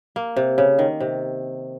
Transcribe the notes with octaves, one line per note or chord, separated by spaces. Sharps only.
A#3
C3
C#3
D#3
C3